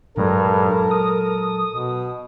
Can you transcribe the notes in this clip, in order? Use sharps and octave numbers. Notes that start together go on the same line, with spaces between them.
G2 A#2 F#3 G#3 A4 A#4
D#6
B2